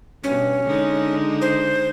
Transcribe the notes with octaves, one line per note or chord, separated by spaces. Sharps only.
G2 B2 C#4
D3 G#3 D#4
C5